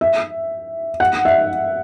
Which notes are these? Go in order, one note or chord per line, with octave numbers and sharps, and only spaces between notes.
E5
F#5
E5